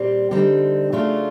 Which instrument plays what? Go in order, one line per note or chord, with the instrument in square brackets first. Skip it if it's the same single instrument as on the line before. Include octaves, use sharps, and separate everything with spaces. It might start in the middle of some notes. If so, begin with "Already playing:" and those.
Already playing: [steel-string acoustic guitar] A#2 G3 C4
D3 G3 C4 D#4
C#3 F#3 A3 D4 F4